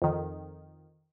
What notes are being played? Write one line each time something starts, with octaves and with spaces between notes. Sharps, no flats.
F2 D#3